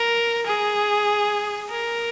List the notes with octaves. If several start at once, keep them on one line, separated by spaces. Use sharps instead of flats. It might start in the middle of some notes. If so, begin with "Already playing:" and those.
Already playing: A#4
G#4
A#4